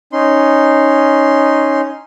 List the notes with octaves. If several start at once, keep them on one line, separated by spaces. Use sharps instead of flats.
C#4 D#4 C6